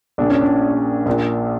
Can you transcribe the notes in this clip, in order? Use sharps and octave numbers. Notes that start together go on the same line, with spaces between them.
A#1 A#2 D4
C#4
D4
A#1 A#2